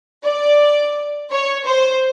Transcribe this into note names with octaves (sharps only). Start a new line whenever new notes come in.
D5
C#5
C5